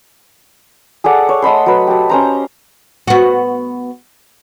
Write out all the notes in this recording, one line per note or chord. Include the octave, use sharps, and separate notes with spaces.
G#4 A4 D5 F#5
C#5
A3 D#5 B5 C6
F#3 B4
G4 A4
C#4 C5 A#5
B3 F#4